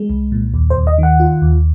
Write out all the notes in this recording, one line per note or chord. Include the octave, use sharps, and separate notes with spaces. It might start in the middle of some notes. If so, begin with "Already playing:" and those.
Already playing: G#3
C2
A#2
D#2
C5
D#2
D#5
D#3 F#5
F4
D#2